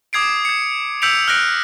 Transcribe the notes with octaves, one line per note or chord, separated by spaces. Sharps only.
D6 D#6 G#6 C7 D7
G#6 C#7
E6 G6 B6 C#7 D7 F7
F6 F#6 A#6 D7